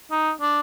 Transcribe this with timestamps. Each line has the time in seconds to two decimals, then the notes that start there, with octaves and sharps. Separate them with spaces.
0.11 D#4
0.42 D4